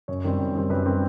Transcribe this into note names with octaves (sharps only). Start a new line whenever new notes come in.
F#2 C#5
D#3 G3 C4
F#2
D#3 G3 C4
F#2 B4
D#3 G3 C4